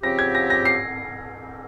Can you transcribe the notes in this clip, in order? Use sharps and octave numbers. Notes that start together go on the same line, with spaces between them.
C#3 F3 C4 G4 A#6
G#6
A#6
A#6
C7